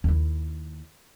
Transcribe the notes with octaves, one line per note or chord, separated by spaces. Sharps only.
D#2 E4